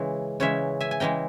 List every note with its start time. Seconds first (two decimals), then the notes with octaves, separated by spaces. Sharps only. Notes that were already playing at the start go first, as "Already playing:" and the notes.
Already playing: C#3 E3 G#3 C#5 E5
0.40 C#3 E3 G#3 C#5 E5
0.80 E5 G#5
0.91 G#5
1.00 C#3 E3 G#3 G5 A#5